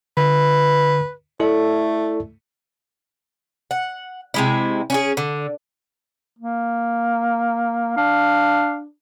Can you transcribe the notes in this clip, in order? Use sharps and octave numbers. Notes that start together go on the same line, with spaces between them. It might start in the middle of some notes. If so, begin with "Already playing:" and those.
D3 B4
A3 E4 A4 D5
F#5
C3 G#3 E4
C#4 F#4 G#4
D3
A#3
D4 F5